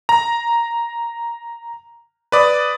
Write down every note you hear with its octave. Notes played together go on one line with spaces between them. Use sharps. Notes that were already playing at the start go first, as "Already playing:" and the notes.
A#5
B4 D5 D#6